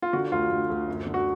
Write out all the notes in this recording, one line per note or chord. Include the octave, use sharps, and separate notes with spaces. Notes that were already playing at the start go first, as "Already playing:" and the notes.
F4
D3 F#4
D2 F4
D2
D2
F#2
D3
F#4